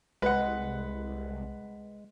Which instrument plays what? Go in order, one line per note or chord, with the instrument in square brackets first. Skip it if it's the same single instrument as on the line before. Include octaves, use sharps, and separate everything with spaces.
[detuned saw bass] C2 [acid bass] G#3 [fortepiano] B4 F#5